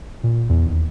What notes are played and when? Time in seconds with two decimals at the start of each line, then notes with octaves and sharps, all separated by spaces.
0.23 A#2
0.50 E2
0.66 D#2